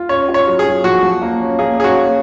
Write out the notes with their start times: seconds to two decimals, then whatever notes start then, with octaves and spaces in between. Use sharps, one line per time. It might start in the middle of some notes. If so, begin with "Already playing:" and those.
Already playing: F4
0.09 C#4 C#5
0.29 F4
0.34 C#5
0.47 F#3
0.59 G#4
0.66 F#3
0.84 F3 F#4
1.03 F3
1.22 A#3
1.40 C#4
1.59 A#3 G#4
1.78 C#4 G#4
1.84 F#4
1.97 A#3